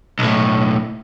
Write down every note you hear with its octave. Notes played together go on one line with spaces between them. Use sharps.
B1 A2